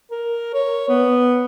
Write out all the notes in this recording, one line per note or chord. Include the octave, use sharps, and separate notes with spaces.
A#4
C#5
B3